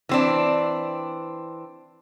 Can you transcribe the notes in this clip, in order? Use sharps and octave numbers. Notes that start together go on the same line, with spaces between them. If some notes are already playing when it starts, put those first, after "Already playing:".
E3 C4 D4